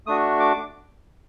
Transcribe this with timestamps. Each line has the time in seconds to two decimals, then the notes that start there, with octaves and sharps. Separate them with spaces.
0.07 A3 D4 F#4 D#6
0.40 D6